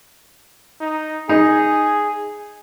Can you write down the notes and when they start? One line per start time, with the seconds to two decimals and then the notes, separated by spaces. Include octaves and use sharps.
0.81 D#4
1.29 D#4 G#4